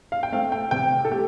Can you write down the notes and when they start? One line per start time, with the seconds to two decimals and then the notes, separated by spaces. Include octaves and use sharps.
0.12 F5
0.23 G5
0.32 A3 C4 F5
0.52 G5
0.71 C3 G5
1.05 A4
1.11 A3 G4